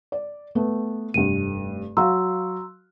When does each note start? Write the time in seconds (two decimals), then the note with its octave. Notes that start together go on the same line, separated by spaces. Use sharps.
0.12 D5
0.55 A3 B3
1.14 F1 G2 D#7
1.97 F#3 F#4 F5 A#5 C6 E6